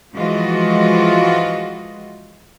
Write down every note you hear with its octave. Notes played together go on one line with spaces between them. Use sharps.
E3 F3 G#3 F4 F#4 D#5